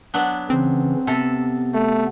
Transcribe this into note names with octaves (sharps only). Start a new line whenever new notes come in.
F#3 B3 D4
C#3 E3 C4 C#4
C3 B3 A4
A3